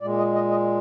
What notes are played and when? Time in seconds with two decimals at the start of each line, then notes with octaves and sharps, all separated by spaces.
0.01 A#2 G#3 D5
0.18 D#5
0.35 D#5
0.51 D#5